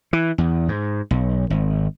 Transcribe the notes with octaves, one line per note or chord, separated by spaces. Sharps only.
E3
E2
G#2
B1
G#1